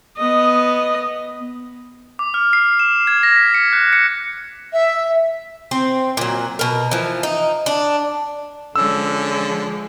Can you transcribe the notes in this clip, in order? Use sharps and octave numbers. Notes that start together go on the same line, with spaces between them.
B3 D#5
D6
F6
C7
E7
G#6
A#6
B6
C#7
F#6
C#7
E5
C4
A#2 F#3
B2 A#4
E3 F3
D#4
D4
D3 F3 G#3 C#4 E6